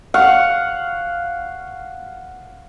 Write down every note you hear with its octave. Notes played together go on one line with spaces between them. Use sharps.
F5 F#5 C#6